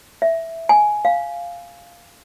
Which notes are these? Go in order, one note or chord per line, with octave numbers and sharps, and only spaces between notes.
E5
G#5
F5